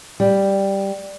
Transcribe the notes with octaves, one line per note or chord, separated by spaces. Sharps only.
G3